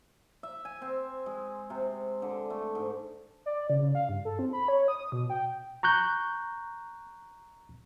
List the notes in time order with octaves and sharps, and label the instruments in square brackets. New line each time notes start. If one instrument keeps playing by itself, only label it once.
[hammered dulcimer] E5
G#5
C4
G#3
C3
D3
A3
G#2
[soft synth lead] D5
C#3
C#3
F5
G2
A4
C4
B5
C#5
D#6
B2
G5
[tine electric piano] A#5 C#6 F#6 G6